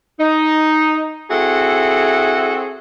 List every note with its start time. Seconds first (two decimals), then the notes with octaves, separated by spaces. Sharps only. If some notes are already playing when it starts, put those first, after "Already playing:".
0.20 D#4
1.30 C4 E4 F#4 G#4 A4